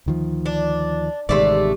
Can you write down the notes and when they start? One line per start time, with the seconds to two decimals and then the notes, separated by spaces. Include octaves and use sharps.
0.06 D2 D#3 F3
0.46 D4
1.29 A1 C3 D#3 G#3 A3 D5